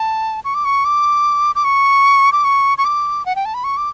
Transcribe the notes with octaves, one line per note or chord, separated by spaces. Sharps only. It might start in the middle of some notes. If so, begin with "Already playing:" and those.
Already playing: A5
C#6
D6
C#6
D6
D6
C#6
D6
C#6
C#6
D6
F#5
G5
A5
B5
C#6
D6